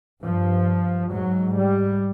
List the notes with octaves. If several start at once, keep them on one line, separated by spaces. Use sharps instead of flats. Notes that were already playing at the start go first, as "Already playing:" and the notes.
G2 F3
G#2 F#3
G3